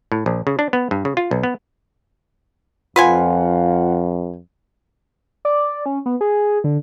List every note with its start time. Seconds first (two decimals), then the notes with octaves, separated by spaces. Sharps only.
0.12 A2
0.26 A#1
0.47 C#3
0.59 D4
0.73 B3
0.91 G2
1.05 C#3
1.17 F4
1.31 B1
1.43 B3
2.96 F2 F4 B4 C5 F5 F#5 G#5
5.45 D5
5.86 C#4
6.06 B3
6.21 G#4
6.64 D3